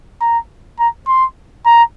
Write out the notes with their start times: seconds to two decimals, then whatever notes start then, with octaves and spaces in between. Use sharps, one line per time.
0.21 A#5
0.80 A#5
1.07 C6
1.66 A#5